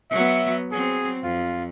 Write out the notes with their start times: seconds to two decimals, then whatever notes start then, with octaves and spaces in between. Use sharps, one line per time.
0.11 F#3 B3 E5
0.72 F#3 C4 G#4
1.23 F2 F4